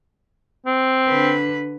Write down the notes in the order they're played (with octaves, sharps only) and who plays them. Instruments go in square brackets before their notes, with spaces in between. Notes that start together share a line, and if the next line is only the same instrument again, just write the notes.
[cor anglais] C4
[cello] D3 B4